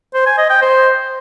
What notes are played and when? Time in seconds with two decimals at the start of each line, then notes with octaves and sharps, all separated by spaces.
0.14 C5
0.26 G#5
0.38 D#5
0.50 G5
0.62 C5